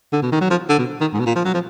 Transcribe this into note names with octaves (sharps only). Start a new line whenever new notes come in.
D3
B2
D#3
F#3
F3
D3
B2
D#3
G#2
B2
A#2
F3
F#3
F3